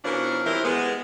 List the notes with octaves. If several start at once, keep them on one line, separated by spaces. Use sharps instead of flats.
B2 E3 F3 C#4 D4 A#4
E3 G3 C4 E4 A#4 C5
G#3 B3